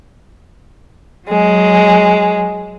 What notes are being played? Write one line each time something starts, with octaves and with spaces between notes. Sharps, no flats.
F#3 G#3